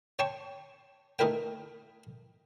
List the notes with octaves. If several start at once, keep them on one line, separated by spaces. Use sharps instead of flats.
C#5 G5 A5 C6 C#6
A3 D#4 E4 A#4 B4 G5